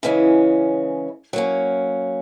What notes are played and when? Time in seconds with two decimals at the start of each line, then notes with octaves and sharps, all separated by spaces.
0.03 C#3 E3 G#3 C#4
1.33 F#3 A#3 C#4